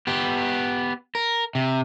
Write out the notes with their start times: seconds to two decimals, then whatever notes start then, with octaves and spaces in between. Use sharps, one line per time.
0.07 B3 G4
1.15 A#4
1.55 C3